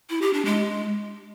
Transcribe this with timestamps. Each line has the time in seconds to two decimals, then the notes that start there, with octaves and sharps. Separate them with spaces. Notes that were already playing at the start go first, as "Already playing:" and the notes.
0.10 E4
0.22 G4
0.34 D4
0.45 G#3